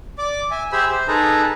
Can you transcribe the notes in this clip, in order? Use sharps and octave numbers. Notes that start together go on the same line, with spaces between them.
D5 D6
E5 G#5
G4 G#4 C5 E5 B5 E6
C5
D#4 G#4 A4 B4 A#5